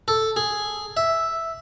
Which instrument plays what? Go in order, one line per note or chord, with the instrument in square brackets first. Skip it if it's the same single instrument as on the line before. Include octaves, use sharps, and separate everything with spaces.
[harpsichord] A4
G#4
E5